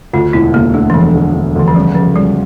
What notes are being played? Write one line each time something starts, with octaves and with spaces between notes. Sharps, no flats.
D2 F4
E1 E4
D2 A#3
D3 A3
E3
E1 F3
D3
D3
D2 E3
F3
C#3 G3
C#3 F3
C#2 G3